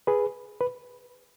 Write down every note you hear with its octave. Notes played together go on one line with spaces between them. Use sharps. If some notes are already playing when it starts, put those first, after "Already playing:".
G#4 B4
B4